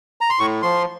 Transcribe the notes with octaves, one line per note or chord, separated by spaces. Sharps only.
A#5
C6
A2 C#6
F3 C6